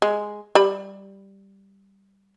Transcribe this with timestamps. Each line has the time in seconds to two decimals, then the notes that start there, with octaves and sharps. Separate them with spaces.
0.02 G#3
0.55 G3 B5